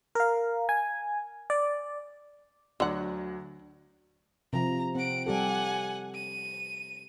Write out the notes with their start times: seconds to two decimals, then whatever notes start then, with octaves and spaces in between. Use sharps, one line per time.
0.15 A#4 F5
0.69 G#5
1.50 D5
2.80 D2 D3 F#3 F#5
4.53 C3 F3 A#5
4.95 C4 F#5 D7
5.26 G3 G4 A4 F#5 G#5
6.14 D#7